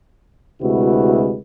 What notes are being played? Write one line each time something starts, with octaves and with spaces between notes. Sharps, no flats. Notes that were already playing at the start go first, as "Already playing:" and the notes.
D2 C3 G#3 E4 F#4 B4